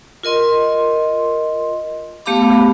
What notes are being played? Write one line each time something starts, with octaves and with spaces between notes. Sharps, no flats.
F4 A#4 D#5 C6
A3 B3 G4 F5 B5 D6